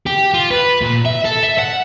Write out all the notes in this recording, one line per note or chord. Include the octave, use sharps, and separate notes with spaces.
G4
F4
B4
A#2
E5
A4
E5
F#5